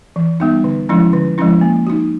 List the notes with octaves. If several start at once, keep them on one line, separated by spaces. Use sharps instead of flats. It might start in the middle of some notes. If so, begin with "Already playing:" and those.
E3
G3 B3 D#4
D3
F3 G#3 C#4 E4
D3
F3 G#3 C#4 E4
A#3
D#4 F#4